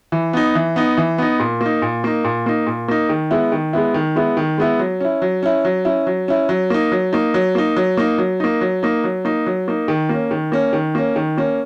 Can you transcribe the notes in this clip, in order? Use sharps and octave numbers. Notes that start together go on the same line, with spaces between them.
E3
B3 D#4
E3
B3 D#4
E3
B3 D#4
A#2
A#3
D#4
A#2
A#3 D#4
A#2
A#3 D#4
A#2
A#3 D#4
D#3
G#3 B3 E4
D#3
G#3 B3 E4
D#3
G#3 B3 E4
D#3
G#3 B3 E4
F#3
C#4 E4
F#3
C#4 E4
F#3
C#4 E4
F#3
C#4 E4
F#3
A#3 D#4
F#3
A#3 D#4
F#3
A#3 D#4
F#3
A#3 D#4
F#3
A#3 D#4
F#3
A#3 D#4
F#3
A#3 D#4
F#3
A#3 D#4
D#3
A#3 C#4
D#3
A#3 C#4
D#3
A#3 C#4
D#3
A#3 C#4